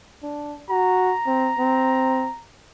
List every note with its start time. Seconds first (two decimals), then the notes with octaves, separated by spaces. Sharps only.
0.23 D4
0.70 F#4 A#5
1.27 C4
1.59 C4